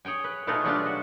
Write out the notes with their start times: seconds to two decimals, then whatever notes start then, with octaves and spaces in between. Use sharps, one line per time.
0.05 G#4 C#5 G5 G#5
0.24 B4
0.47 B2 A3 B3 D#4 F4 G#4
0.64 F#3 G3 D4 F4
0.86 F#4